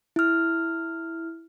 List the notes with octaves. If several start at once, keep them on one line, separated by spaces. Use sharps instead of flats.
E4 F6